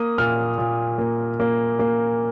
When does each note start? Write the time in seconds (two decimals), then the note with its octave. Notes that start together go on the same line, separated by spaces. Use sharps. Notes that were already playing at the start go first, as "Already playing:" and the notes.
Already playing: A#3 D#6
0.18 A#2 F6
0.58 A#2
0.98 A#3
1.40 A#3
1.79 A#3